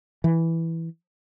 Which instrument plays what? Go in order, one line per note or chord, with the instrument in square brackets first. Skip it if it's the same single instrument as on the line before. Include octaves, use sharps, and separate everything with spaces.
[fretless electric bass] E3